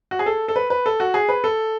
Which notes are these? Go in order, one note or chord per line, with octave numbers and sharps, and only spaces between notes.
F#4
G#4
A4
A4
B4
B4
A4
F#4
G#4
B4
A4